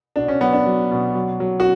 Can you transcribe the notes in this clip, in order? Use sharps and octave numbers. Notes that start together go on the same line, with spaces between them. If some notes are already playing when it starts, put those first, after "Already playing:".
B2 D4
C#4
F#3 B3
D4
F#3
B2
F#3
F#3
F#4